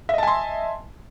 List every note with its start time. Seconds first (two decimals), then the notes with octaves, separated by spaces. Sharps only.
0.09 E5
0.14 D#5
0.18 A5
0.23 G#5
0.27 C6